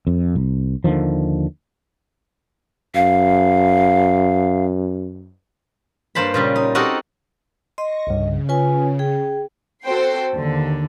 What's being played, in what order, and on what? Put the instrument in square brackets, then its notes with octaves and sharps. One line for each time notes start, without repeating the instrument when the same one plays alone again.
[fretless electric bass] F2
C2
D#2 D3 D#3 F3
[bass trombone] F#2 [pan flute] F5
[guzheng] G2 A#3 C5 A5 B5
A#2 C#3 G3
D#4
C4 D#4 F#4 G4 A4 A#4
[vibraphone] D#5 [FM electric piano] C6 [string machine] C#6 A#6
[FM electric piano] C2 G2 [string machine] C#3
[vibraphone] F4 B4 G#5 [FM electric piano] C#5
[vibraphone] G#4 G5
[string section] C4 F#4 A4 C5 G5 C7
D#2 D3